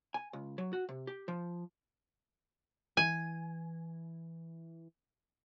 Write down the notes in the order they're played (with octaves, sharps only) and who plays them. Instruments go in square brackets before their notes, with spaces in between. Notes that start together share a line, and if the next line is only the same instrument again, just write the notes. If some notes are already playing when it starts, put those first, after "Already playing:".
[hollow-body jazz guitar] G#5
C#2
F#3
F#4
C3
G4
F3
[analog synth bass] E3 [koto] G#5